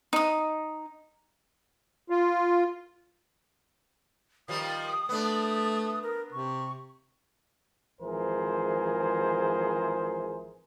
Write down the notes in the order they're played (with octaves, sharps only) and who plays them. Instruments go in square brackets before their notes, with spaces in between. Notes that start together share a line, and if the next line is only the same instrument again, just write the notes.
[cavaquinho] D#4 D#6
[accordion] F4
[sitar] D#3 F3 G3 [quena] D#6
[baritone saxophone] A3 [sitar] B3 D4
[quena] A#4
[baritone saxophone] C3 [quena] C#6
[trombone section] G#1 E3 F3 G#4 A#4 C5